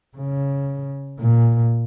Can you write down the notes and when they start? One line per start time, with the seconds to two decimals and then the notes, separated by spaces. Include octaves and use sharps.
0.17 C#3
1.19 A#2